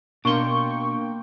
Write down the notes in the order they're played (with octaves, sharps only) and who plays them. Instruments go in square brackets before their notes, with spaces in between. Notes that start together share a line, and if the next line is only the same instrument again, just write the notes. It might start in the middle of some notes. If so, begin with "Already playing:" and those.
[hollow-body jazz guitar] B2 [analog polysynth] A#3 G5 [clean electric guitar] D4 C6 [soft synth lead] C#6